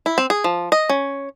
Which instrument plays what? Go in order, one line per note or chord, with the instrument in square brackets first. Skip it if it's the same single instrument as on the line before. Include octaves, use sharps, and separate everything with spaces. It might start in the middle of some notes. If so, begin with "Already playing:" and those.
[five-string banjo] E4
C4
G#4
F3
D#5
C#4